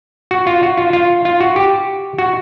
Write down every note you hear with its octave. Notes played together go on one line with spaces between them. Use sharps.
F#4
F4
F#4
F4
F4
F4
F#4
G4
F#4